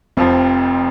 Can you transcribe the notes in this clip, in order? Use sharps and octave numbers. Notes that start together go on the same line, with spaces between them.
F1 F2 F3 C4